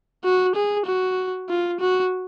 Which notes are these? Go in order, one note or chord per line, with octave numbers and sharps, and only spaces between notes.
F#4
G#4
F#4
F4
F#4